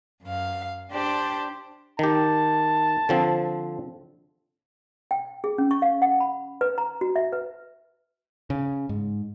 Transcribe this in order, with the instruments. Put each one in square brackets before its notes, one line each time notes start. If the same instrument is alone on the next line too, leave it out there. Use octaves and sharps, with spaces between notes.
[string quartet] F#2 F5
D4 G4 C5 D5 A5
[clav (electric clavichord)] D#3 G4 [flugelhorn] A5
[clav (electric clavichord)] D3 F3 C4
[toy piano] G5
G#4
C#4
C#6
F5
F#5
B5
B4
A#5
F#4
E5
B4
[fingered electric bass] C#3
G#2